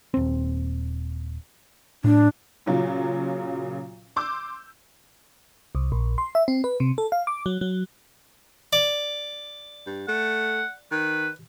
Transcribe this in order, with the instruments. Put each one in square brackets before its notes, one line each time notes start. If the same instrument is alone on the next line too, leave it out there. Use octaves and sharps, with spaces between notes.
[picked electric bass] D#1 C4
[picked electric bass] A2 [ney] D4
[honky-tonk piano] A#2 C#3 F#3 F4
C6 D6 E6 G6
[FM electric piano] C2
A#1
C6
E5
C4
B4
C3
A4
F5
D6
F#3
F#3
[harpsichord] D5
[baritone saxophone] G2
[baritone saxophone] A3 [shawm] F#5
[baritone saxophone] D#3 [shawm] B4